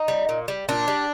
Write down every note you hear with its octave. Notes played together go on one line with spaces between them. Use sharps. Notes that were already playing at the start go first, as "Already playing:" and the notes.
Already playing: D#4
G3
A#2
G3
A#2 D4
G3